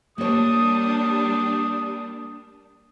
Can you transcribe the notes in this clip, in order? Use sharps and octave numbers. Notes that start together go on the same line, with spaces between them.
G3 A#3 D4 C#5 D#6